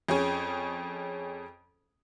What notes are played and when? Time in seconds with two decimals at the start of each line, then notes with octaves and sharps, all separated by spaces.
0.09 F2 C#4 G#4